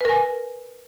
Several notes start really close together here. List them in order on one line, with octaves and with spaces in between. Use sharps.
B4 A#4 G#5